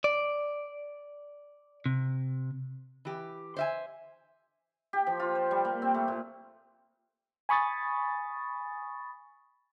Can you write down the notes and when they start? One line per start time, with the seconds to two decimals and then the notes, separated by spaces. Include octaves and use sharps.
0.04 D5
1.86 C3
3.05 E3 G4
3.57 C5 E5 G#5
4.93 G4
5.07 F3
5.20 F4
5.35 C5
5.51 G3
5.65 A#3
5.82 C4
5.94 A3
6.08 A#2
7.49 G#5 B5 C#6 D#6 A6